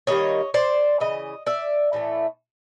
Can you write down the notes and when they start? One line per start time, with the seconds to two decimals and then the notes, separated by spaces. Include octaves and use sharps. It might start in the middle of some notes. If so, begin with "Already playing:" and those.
0.07 D#3 G3 A#3 C#5 D#5
0.54 C5 D5
1.00 C#3 E3 D#5
1.46 D5 E5
1.93 A2 E3 A3